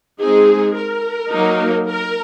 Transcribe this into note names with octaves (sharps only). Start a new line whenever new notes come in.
G#3 C4 D#4 G#4
A#4
F#3 A#3 D#4
A#4